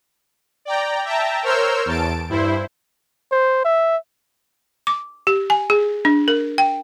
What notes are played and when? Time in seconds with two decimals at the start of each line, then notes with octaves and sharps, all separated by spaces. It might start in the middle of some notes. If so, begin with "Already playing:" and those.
0.65 D5 G5 A#5
1.05 E5 G5 A5 A#5
1.43 A#4 C5 C#5 E6 F6 G6
1.85 E2 A5 D7
2.29 G2 E4 C5
3.32 C5
3.65 E5
4.87 D6
5.27 G4
5.50 G#5
5.70 G#4
6.05 D4
6.28 A#4
6.58 G5